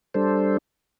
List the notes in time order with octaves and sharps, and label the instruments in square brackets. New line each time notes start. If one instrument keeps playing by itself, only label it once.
[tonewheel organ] G3 D4 A4 C5